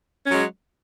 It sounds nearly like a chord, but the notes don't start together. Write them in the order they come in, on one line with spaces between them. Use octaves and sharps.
C#4 F#3 G#3